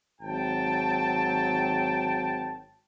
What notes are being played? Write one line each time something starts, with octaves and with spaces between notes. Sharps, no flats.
G#1 F#3 G5 A5